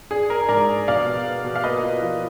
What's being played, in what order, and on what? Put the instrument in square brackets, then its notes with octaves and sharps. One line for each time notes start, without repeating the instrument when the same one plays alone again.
[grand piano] D4 [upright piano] G#4
[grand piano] D4 [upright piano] A#4
[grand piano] G#2 [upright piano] A#4 D5
[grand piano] D4
[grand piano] B2 [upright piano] D5 F5
[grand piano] B2
B3
B2
[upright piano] F5
[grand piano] A#3 [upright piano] B4 D#5
[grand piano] F4
F3